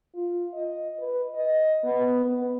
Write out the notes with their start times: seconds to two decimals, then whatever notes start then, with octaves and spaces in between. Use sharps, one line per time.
0.14 F4
0.54 D#5
0.99 B4
1.35 D#5
1.84 B3
2.25 B3